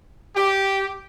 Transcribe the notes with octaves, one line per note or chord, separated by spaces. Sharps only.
G4